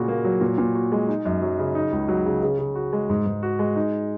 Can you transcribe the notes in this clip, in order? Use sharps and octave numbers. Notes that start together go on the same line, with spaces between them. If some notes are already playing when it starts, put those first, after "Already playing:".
Already playing: A#2 C#3 F#4
A#3
F#3
A#2
A#2
F#4
G#3
D#4
F#2
F#3
C#3
D#4
C#2
F#3
C#3
C#3
C#3
F#4
G#3
G#2
G#2
F#4
G#3
D#4